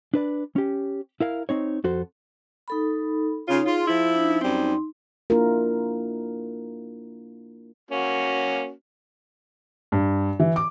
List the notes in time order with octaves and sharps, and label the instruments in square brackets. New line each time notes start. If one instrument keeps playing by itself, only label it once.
[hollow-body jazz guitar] D4 B4 D5
C#4 G4
E4 A#4 F5
C4 D#4 C#5
F2 F#4 A4 C5
[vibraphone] D#4 A4 B5
[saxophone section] C#3 F4 [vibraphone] D#4 C#5
[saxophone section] F4 [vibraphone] G#4 C6
[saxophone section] F3 E4
[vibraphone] D4 D#4
[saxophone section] F#2 G3 C4 [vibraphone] D#4 C6
[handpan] A#3 D4 E4 F4 A#4
[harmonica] A#3 C#4 F#4
[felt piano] G2
E3
D6